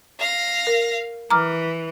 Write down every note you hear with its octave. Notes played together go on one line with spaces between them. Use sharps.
F5 A#6
A#4
E3 A#5 D6 F6